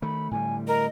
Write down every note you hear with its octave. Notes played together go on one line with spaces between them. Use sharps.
D#3 A3 B5
A2 D3 G3 G#5
A#4 D#5